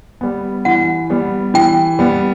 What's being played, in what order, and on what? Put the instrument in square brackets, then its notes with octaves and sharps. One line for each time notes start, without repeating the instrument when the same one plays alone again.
[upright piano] G3 B3
[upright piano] E3 [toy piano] F#5
[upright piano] G3 B3
[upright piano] E3 [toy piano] G5
[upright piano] G3 B3